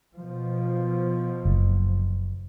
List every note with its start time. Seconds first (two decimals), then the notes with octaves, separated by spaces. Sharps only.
0.15 B2 F3
1.45 F#1